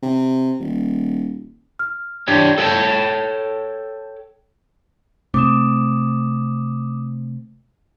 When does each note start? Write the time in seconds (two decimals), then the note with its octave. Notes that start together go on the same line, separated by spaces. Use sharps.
0.03 C3
0.60 D#1
1.79 F6
2.28 D4 G4 C#5
2.58 A4 C#5 D#5 F#5 G5 A5
5.34 C3 A3 C4 D6 D#6 E7